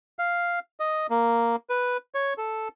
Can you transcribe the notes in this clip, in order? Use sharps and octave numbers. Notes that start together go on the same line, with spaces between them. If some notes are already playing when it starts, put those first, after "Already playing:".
F5
D#5
A#3
B4
C#5
A4